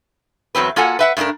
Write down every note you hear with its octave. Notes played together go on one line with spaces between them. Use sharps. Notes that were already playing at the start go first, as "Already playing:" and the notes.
E2 F#3 C4 B4
A#3 F4 F#4 A4 F#5 G#5
B4 E5 F#5
G2 A3 B3 D4 A#4